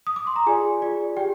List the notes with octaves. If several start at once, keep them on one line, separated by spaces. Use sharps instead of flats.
D#6
D6
C6
A#5
F4 G#4 D5 G#5
F4 G#4 D5
G4 G#4 D5 G5